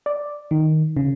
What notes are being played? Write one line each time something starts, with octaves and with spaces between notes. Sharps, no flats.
D5
D#3
C#3